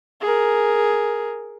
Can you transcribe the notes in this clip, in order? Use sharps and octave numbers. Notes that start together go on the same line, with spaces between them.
G#4 A#4